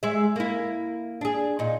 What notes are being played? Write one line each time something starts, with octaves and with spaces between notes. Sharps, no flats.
G#3 E5
A#3 E4
D4 G#4
A#2 D#4